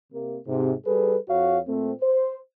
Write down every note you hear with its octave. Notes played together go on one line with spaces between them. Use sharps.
C3 A#3
G#2 C3
G3 G#4 A4 B4
F2 F#4 C#5 F5
A#2 A3 C4
C5